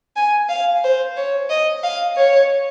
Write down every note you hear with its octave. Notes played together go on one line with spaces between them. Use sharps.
G#5
F5
C5
C#5
D#5
F5
C#5